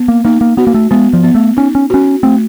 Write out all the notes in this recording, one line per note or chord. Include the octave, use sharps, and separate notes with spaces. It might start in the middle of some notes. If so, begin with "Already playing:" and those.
Already playing: B3
A#3
A#3 D#4
A#3
B3 F#4
A#3
A3
G#3 B3
F3
B3
A3
C#4 D#4
C#4
C#4 F#4
A3 C4